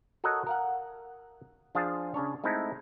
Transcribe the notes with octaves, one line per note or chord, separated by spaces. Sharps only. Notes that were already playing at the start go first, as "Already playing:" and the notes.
F#4 A4 A#4 C#5 D#5 F#5
A#4 F5 F#5
F3 D4 F4 G#4 F5 A5
C#3 C#4 D4 C#5
G#3 A3 C4 D#4 E4 A4